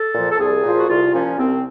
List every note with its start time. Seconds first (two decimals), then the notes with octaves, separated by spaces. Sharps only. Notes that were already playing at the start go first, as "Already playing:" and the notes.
Already playing: A4
0.14 A#2 F3
0.30 A4
0.38 C2 G#4
0.64 A#2 F3
0.77 F#4
0.88 C2 F4
1.13 A#2 F3 C#4
1.37 C2 C4